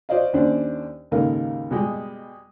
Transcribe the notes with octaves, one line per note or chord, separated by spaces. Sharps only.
F#4 C5 D5 D#5 F5
D#2 C#4 D4 C5 D5
D#2 G#2 C#3 A4 A#4 F5
B2 G3 G#3